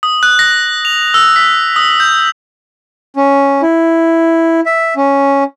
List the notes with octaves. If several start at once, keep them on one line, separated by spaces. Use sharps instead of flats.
D#6
F#6
A#6
F7
E6
B6
D#6
G6
C#4
E4
E5
C#4